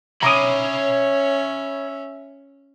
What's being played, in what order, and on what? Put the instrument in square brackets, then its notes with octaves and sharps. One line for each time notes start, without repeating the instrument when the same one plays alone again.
[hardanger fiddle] C#4 [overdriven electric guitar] C#5 B5 [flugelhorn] E5 [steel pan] A#5 D6 D#6